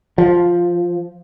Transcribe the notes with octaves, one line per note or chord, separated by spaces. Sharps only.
F3